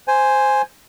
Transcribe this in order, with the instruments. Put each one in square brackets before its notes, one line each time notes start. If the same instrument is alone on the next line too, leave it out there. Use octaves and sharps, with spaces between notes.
[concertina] C5 G#5